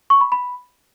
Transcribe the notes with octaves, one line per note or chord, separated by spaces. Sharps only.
C#6
B5
B5